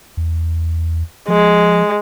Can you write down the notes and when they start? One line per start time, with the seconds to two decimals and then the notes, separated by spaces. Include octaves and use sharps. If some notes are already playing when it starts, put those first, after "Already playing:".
0.17 E2
1.28 F3 G#3